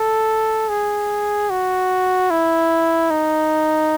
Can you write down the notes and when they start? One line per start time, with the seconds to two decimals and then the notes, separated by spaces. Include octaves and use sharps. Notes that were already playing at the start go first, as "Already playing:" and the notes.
Already playing: A4
0.69 G#4
1.50 F#4
2.31 E4
3.11 D#4